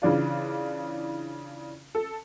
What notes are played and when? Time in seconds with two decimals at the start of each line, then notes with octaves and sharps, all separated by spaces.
0.02 C#3 E3 D4 F4
1.95 A4